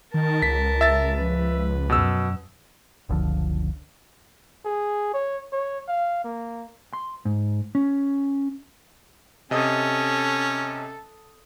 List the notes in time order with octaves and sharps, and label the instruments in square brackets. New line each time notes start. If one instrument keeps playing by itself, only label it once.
[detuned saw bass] D#3 [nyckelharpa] A#4 A5
[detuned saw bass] C#2 [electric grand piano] B6
[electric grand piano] E5 A6
[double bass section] F3 [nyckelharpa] B4
[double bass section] F#2 [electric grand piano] B2 E6
[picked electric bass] F#1 C#2 D3 F3
[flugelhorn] G#4
C#5
C#5
F5
A#3
[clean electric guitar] C6
G#2
C#4
[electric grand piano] C3 D#5 D#6 [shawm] C#4 [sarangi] A4